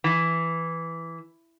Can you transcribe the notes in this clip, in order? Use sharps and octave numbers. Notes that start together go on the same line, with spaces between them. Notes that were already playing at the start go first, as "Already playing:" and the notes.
E3